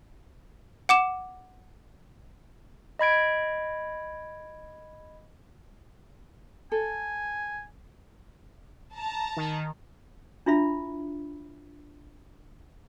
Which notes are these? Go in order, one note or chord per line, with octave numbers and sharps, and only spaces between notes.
F#5 D6 E7
D#5 B5 G#6 D7
A4 G#5
A5 A#5
D#3
D4 E4 F4 E5 B5